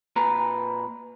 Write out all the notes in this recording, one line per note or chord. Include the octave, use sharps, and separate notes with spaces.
A#2 B4 A#5